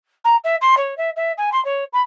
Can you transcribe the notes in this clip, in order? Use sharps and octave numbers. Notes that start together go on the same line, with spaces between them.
A#5
E5
C6
C#5
E5
E5
G#5
C6
C#5
B5